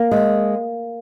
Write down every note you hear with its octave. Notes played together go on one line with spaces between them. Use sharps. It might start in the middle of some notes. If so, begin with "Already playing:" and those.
Already playing: A#3
G#3